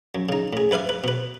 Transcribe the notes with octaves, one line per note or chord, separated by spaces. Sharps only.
F#2
C#3 D#4
A2 G#4
G2 B4 E5 F5 D#6
B4
B2 B4